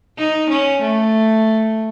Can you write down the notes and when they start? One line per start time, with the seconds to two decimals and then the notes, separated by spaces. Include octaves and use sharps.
0.18 D#4
0.50 C#4
0.81 A3